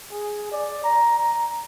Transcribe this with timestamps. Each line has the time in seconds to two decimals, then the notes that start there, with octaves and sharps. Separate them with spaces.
0.11 G#4
0.52 D5
0.84 A#5
1.16 A#5